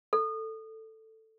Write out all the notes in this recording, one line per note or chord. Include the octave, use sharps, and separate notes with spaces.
A4